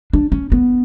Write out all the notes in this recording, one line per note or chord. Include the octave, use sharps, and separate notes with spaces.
D4
C#4
B3